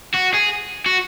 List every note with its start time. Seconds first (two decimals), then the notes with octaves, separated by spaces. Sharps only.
0.14 F#4
0.34 G#4
0.86 F#4